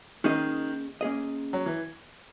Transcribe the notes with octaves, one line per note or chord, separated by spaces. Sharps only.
D#3 A#3 C#4 G#4 D#5
A#3 C#4 G#4 D#5
F#3
E3